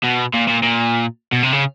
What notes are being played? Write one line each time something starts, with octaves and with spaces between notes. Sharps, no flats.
B2
A#2
A#2
A#2
B2
C3
C#3